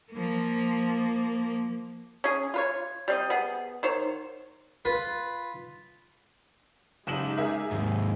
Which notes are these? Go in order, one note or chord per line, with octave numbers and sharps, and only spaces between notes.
F3 A#3
C#4 G#4
F4 B4 C#5
G3 C4 D#5
B3 G#4
D#3 C5 C#5
F4 B4
F#1 G#3 D#4 G4 E7 F#7
G#4 A#4 E5
D#2 G#2